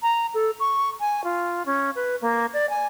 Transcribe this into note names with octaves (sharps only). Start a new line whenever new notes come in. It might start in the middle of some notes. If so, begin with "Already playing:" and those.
A#5
A4
C#6
G#5
F4
C#4
B4
A#3
D5
G#5